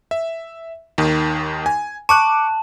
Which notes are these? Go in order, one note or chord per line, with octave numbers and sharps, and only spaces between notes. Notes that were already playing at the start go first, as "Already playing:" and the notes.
E5
D#2 D#3
G#5
A5 C#6 D6 F#6